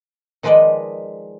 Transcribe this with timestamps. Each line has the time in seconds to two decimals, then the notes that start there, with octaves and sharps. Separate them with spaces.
0.43 D#3 F3 G#3 B4 D5 D#5